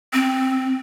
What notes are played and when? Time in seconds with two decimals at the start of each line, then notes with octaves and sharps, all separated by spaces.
0.13 C4